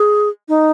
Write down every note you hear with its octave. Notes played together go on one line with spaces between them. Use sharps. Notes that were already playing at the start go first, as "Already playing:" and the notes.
Already playing: G#4
D#4